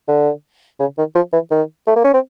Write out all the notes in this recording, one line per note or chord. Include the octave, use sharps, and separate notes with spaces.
D3
C#3
D#3
F3
E3
D#3
A3
A#3
C#4
C4